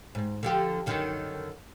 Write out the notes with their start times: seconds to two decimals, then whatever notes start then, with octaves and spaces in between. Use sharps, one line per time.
0.15 G#2
0.43 D3 F3 G4
0.86 F#2 D3 D#3